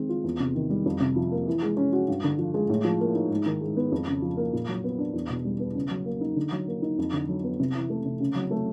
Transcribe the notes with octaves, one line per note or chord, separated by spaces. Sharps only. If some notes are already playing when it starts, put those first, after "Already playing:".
Already playing: D#3 G#3 C4
F4
E2
C3
D#3
G3
F2
C3
F3
A#3
E3
G#3
C#4
F#4
G2
D3
F3
G#3
A2
F3
A#3
D#4
G#2
D#3
G#3
B3
F2
C#3
F3
A#3
A#2
F#3
B3
D4
E2
B2
G3
B3
C#3
F#3
A#3
D#4
D3
F#3
A#3
D#4
F2
D3
F#3
B3
C3
E3
A3
C3
C#3
F#3
A3